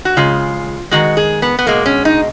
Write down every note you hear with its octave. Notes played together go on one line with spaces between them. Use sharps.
F#4
C#3 G#3 F4
D#3 G#3 F#4
G#4
B3
B3
B2 G#3 A#3
C#4
D#4